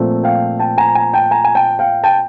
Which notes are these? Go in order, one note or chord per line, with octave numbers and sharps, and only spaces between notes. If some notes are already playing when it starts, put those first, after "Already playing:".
Already playing: A#2 F3 A3 C4
F5 G5
G5 A5
G#5 A#5
G#5 A#5
G5 A5
G#5 A#5
G#5
G5 A5
F5 G5
G5 A5